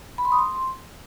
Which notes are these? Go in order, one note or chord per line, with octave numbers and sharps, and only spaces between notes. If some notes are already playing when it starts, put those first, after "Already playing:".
B5
C6
D#6
C6